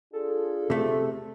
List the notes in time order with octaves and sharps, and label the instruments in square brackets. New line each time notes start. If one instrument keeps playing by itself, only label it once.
[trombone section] D4 F4 G#4 [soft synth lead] A4
[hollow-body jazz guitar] C3 A3